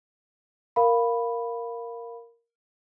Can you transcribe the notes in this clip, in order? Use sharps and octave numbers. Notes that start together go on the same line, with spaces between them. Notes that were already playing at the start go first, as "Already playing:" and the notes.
A#4 F5 B5